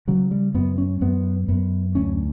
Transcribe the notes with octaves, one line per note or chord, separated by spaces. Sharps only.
C#3 F#3
G3
F#2 B3
C#4
F#2 B3
F#2 B3
D2 C#4